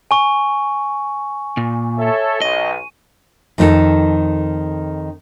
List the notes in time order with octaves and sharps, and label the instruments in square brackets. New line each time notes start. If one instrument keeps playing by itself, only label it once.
[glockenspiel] G#5 C#6
[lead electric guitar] A#2
[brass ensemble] A4 C#5 E5
[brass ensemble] B1 [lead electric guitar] D#5 [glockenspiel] D#7
[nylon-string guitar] F2 D#3 D#4 G#4 A4